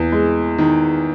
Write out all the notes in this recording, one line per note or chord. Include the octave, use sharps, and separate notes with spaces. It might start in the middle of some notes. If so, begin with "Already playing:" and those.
Already playing: E2
G#3
D#3